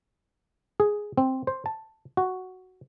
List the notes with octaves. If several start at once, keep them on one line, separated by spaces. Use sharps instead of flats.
G#4
C4
C5
A5
F#4